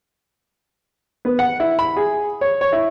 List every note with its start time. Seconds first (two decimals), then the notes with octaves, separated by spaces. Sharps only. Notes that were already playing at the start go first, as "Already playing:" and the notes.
1.25 B3
1.39 F#5
1.60 E4
1.79 B5
1.97 G#4
2.41 C#5
2.61 C#5
2.72 E4